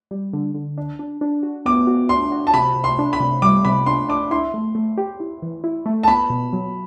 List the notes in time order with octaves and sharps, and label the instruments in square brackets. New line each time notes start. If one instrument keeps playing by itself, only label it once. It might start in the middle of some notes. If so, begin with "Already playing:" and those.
[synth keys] G3
D3
D3
D4
D4
D4
F#4
[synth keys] B3 [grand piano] D6
[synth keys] F#4
[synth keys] D4 [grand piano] C6
[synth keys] F#4
[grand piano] A5
[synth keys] C3 [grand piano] B5
[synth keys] C3
[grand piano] C6
[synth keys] D4
[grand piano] B5
[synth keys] C3
[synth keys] G3 [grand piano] D6
[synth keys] C3 [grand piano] B5
[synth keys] D4 [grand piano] C6
[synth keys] D4 [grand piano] D6
[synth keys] E4 [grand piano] C6
[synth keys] A3
A3
G4
E4
E3
E4
A3
[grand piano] A5
[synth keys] B3 [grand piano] B5
[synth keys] B2
F#3